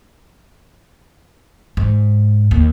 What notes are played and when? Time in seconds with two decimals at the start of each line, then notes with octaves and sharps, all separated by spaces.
1.77 G#2
2.51 D#2